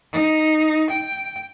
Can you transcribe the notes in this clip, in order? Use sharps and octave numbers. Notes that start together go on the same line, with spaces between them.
D#4
G5